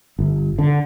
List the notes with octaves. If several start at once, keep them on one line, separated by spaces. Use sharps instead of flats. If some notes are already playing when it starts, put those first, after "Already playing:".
G1
D3